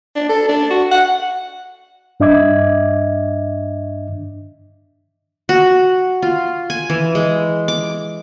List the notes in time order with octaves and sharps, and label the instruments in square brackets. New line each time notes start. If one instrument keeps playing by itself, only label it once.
[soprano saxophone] D4
A4
D4
F#4
F#5
[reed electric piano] G2 D4 D#5 E5 D6 G#6
[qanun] F#4
F4
G#5
E3
G#3
D6